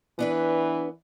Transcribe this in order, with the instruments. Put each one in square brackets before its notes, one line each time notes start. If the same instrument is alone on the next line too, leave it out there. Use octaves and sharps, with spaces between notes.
[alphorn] E3 [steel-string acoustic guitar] B3 D4 B4